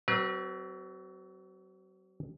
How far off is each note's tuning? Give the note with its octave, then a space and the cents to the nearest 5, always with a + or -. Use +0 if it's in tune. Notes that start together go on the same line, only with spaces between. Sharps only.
F#3 +30 C4 -15 B4 -45